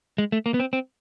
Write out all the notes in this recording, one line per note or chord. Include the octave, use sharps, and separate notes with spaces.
G#3
A3
A#3
B3
C4
C4